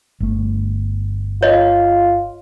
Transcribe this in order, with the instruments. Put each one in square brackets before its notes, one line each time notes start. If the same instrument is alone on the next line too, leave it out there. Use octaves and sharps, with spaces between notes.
[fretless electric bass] G1 A3
[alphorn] F4 [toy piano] C#5 D#5